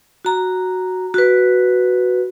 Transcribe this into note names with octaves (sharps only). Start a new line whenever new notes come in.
F#4 A#5
F#4 B4